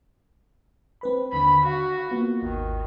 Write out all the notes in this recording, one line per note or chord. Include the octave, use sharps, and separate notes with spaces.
C4 B4 B5
D#2 D3 B5
F#4 F5
A#3 B3 F4
G#1 D#2 D#3